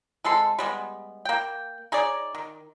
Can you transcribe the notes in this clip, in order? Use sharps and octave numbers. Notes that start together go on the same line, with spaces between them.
C3 G#3 A4 C6
G3 G#3 B3
A#3 G5
D#4 G#4 C#5 D5
D#3